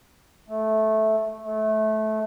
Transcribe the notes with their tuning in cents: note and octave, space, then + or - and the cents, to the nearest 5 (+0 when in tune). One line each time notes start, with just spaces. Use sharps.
A3 -10
A3 -20